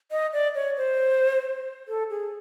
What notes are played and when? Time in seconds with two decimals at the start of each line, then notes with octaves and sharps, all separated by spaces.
0.12 D#5
0.33 D5
0.55 C#5
0.77 C5
1.88 A4
2.10 G#4